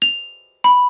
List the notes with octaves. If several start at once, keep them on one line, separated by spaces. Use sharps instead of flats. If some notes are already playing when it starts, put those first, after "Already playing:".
F7
B5